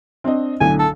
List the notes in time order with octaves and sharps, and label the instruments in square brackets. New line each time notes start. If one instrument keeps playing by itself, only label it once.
[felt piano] C4 D4 D#5
[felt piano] B1 A2 D3 [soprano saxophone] G#5
[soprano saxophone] A4